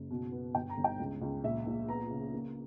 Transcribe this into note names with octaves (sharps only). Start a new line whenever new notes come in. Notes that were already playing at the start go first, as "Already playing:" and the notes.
Already playing: F#1
B2
B3
G1 G5
A#5
G1
G5
C#2
C#2
A#1 E5
A#1
B3 A#5
C#3
A#3